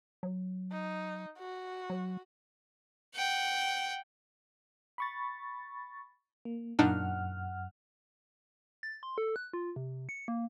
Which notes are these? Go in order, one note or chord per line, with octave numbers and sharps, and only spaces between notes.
F#3
D#4
F#4
F#3
F#5 G5
B5 C#6 A6
A#3
F#2 A#2 D4 D#4 F#5 F6
A6
C6
A4
F#6
F4
C3
C#7
A#3